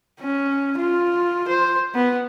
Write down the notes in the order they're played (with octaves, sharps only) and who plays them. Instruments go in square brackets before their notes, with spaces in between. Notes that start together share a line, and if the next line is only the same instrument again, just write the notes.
[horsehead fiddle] C#4
F4
C5
B3